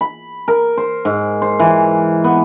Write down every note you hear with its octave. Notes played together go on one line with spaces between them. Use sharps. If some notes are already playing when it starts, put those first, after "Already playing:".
B5
A#4
C5
G#2
C5
E3
B3